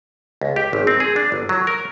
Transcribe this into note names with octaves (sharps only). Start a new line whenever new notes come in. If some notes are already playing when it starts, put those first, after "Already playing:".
C#2
G4
G#1
C4
G#4
D4
G1
F#3
A#4